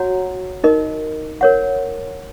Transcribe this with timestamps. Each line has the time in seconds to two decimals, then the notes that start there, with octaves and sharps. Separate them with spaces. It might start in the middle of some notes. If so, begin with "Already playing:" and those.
Already playing: F#4 C#5 F#5 A#5
0.64 D#4 A#4 D#5
1.41 A#4 C#5 F#5